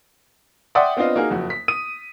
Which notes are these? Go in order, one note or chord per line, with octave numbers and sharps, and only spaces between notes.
D5 E5 F#5 G5 C6 D#6
B3 C4 D4 F4 D#5 F5
A#3 D#4 F#4 G#4
F#1 F2 F#4
B6
D#6 D#7